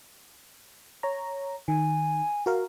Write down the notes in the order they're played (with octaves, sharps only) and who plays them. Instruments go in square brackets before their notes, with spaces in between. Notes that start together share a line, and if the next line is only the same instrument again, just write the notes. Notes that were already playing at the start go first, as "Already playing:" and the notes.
[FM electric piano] C#5 A#5
[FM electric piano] D#3 [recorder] G#5
[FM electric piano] F#4 A#4 F5